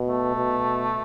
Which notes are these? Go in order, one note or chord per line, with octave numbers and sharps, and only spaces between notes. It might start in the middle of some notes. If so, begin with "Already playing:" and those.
Already playing: B2
A3
B2